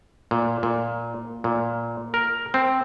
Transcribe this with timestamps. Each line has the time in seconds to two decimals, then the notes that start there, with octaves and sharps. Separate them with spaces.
0.31 A#2
0.63 A#2
1.44 A#2
2.14 A#4
2.54 C4